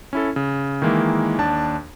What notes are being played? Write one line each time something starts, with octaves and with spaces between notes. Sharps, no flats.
C#4 E4 A4
C#3
D#3 E3 G#3 A#3 E4
D#2 D4 A5